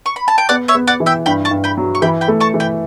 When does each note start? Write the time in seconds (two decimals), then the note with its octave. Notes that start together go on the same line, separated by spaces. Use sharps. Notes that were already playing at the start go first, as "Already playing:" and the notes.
0.06 C#6
0.16 B5
0.28 A5
0.38 G5
0.49 B3 D5 F#5
0.68 C#5 E5
0.75 B3
0.87 D5 F#5
1.00 E3
1.06 E5 G5
1.26 G2 G5 B5
1.45 A5 C#6
1.51 G2
1.64 G5 B5
1.77 F#3
1.95 C#6
2.02 E3 G5 B5
2.21 G5 B5
2.28 A3
2.40 A5 C#6
2.54 E3
2.60 G5 B5